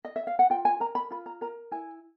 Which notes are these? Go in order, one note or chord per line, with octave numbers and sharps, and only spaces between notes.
D#5
E5
F5
F#5
F4 G5
G#5
A#4 A#5
B5
F4 B5
A#5
A#4 A#5
E4 G#5